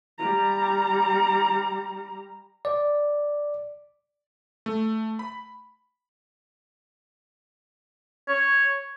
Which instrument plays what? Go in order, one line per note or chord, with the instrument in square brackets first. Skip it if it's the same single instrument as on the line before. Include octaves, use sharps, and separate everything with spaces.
[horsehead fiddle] G3 A#5
[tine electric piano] D5
[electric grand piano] A3
B5
[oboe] C#5